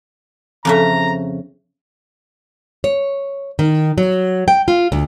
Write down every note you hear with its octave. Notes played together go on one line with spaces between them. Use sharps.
F2 C#3 E5 A#5
C#5
D#3
F#3
G5
F4
D2